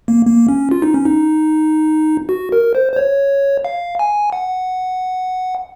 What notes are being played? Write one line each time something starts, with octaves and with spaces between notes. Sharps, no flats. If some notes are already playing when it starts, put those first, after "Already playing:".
A#3
A#3
C#4
F4
D#4
C#4
D#4
F#4
A#4
C5
C5
C#5
F5
G#5
F#5